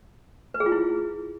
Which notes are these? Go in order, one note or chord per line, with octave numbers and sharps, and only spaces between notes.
B4
G#4
F4
E4